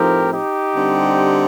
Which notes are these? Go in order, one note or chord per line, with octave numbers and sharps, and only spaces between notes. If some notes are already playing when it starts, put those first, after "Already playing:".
Already playing: A2 F3 C4 D#4 G4 A#4
D#4 G4
D3 G3 C4